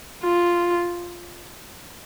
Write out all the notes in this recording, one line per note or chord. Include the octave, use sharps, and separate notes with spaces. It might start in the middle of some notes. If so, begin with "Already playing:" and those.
F4